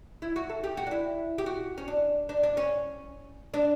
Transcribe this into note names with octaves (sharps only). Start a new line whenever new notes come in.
E4
F#4
A4
G4
F#4
D4
E4
G4
F#4
C#4
D4
D4
D4
C#4
D4